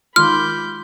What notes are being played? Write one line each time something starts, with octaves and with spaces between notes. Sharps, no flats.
D#3 G#3 F4 B5 C6 D6 F6 G6